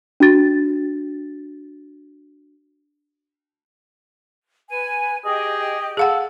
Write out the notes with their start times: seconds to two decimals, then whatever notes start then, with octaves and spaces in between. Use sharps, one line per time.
0.20 D4 F#4 A6
4.69 B4 G#5
5.25 G4 G#4 D#5
5.97 G#4 A4 F5 F#5